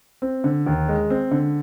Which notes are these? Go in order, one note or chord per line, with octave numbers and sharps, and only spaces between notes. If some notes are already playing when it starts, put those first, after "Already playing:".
C4
D3
D#2
G#3
C4
D3